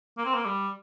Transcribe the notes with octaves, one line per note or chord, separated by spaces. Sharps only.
A#3
C4
A#3
G3